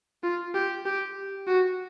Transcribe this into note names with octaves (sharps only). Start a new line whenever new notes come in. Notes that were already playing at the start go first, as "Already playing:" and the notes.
F4
G4
G4
F#4